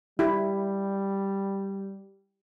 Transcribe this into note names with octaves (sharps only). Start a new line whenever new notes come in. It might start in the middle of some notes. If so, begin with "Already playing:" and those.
G3 E4 G4